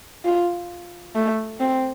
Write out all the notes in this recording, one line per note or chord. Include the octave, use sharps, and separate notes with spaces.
F4
A3
C4